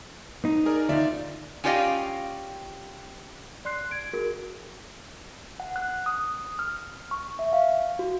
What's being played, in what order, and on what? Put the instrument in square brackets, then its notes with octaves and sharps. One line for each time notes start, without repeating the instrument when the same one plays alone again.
[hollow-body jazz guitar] D#4
[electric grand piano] G#4 A#4 D5
[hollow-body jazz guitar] D2 D#4 [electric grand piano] F4 D5 E5
[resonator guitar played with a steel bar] C#4 F4 G4 D5 D#5 F5
[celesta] D5 C6 F#6 C7
G#6 D7
F#4 G#4 A#4
[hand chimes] F#5
F#6
D#6
F6
C#6
E5
F5
F#4